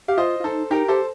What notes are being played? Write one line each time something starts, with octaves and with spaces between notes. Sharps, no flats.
G4 F5
F4 C5 D#5
F4
D#4 A4 C5
D#4 G4 A#4
G4 A4 C5